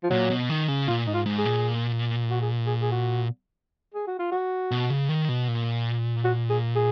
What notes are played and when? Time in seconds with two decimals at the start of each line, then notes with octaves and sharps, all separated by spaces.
0.03 F3
0.10 A#2 F#3
0.30 B2
0.50 D#3
0.68 C#3
0.88 A#2 F4
1.06 G#2 D#4
1.14 F4
1.26 G#2
1.38 G#4
1.45 A#2
2.31 F#4
2.42 G#4
2.66 G#4
2.82 G#4
2.92 F#4
3.94 G#4
4.07 F#4
4.19 F4
4.32 F#4
4.71 B2
4.90 C#3
5.09 D#3
5.29 B2
5.48 A#2
6.24 F#4
6.50 G#4
6.75 G#4